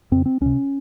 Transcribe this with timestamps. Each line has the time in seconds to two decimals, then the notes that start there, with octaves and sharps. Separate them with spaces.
0.11 F2 C#3 C4
0.26 C4
0.41 C#2 C3 C#4